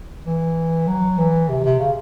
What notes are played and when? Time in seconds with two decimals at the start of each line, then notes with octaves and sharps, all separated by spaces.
0.25 E3
0.87 F#3
1.18 E3
1.49 C3
1.64 C3
1.80 C#3